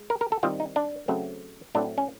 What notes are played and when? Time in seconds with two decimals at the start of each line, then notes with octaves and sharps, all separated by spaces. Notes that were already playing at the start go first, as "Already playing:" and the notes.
Already playing: G#3
0.10 A#4
0.21 A#4
0.32 A4
0.43 D#3 G3 C4 F4
0.60 D#4
0.76 D4
1.08 C#3 F#3 A3 C4
1.75 A2 F#3 A3 C4 D4
1.98 C#4